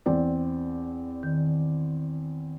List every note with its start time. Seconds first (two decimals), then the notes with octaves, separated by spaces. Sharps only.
0.06 E2 C4 D5
1.23 D#3